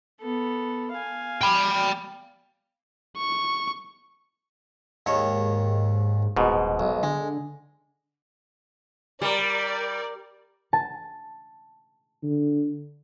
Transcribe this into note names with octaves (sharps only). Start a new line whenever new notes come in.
B3 A4
F5 G#5
G5 B5
C#6
D#2 G#2 D#3 C#5
D#1 G#2 B2
B1
D3 G#3
G3 A#4 D5
A5
D3